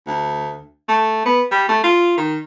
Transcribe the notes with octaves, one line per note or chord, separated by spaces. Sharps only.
D2
A3
B3
G3
A3
F4
D#3